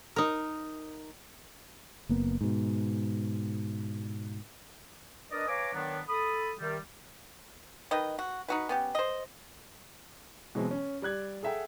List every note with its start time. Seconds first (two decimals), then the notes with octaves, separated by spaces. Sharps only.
0.16 D#4 A#4
2.09 F#1 A#3 B3
2.41 G#2 B2
5.32 D4 A#4 B4 D5 D#5
5.48 B4 C#5 F5 G#5 A#5 D6
5.74 D#3 F#3 B3 D4
6.08 A4 B5 D#6
6.59 C3 D#3 G3
7.91 D#3 B4 D#5
8.19 F#4
8.48 D#4 F#4 B4
8.69 B3 C#4 G4
8.95 C5 D#5
10.55 B2 E3 F#3 G#3 C4
10.71 C#4
11.02 G3 D5 F#6 G#6
11.43 G#4 A4 E5 F#5 G5